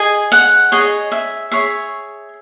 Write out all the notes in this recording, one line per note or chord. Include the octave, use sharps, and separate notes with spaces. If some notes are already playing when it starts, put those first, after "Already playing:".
Already playing: G#4 D#5 G#5
F#5
G#4 C#5 D#5
E5
G#4 C#5 E5